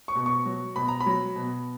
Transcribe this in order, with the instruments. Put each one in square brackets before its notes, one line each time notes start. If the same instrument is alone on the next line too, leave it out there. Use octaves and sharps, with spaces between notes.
[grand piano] C#6
B2
C#6
F#3
B2 B5
A#5
B5
F#3
B2